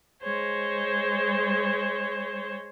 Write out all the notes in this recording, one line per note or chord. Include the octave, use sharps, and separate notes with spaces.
G#3 C5 C#5